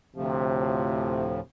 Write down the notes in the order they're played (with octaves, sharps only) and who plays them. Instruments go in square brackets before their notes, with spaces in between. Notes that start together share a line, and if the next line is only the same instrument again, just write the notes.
[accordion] D2 A2 F3 [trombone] C3